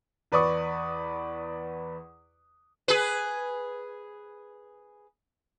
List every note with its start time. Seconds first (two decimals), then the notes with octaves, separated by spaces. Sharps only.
0.32 E2 B4 D5 C#6 D#6
2.88 G#4 B4